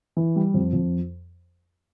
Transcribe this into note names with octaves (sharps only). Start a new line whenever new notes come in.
E3
G3
F2
F2